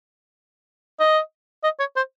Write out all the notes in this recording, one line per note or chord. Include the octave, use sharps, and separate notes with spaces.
D#5
D#5
C#5
C5